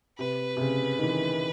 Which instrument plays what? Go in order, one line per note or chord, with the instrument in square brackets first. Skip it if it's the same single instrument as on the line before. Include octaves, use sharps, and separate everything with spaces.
[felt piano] C3 [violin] B4
[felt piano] C3
C#3
D#3
E3